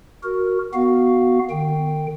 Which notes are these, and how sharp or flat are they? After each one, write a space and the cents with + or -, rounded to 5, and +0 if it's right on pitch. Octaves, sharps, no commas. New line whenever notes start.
F#4 +0 A#4 +0
B3 +0 F#4 +0 F5 +0
D#3 -40 G5 +0